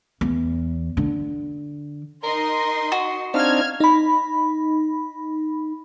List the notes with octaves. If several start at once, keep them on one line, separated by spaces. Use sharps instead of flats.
E2
D3
D#4 A#4 D#5 C6
F#4
C4 D4 D#4 F5 F6 G#6
D#4 B5